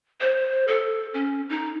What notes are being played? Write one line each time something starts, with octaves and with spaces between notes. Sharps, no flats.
C5
A4
C#4
D#4